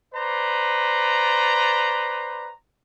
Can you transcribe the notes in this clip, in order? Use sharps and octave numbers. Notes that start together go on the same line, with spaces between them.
B4 C5 D5 A#5